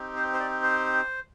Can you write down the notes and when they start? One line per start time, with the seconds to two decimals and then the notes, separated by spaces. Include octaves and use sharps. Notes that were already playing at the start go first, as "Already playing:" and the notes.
Already playing: C4 D#4 G4
0.16 C5
0.34 C5
0.40 D5
0.63 C5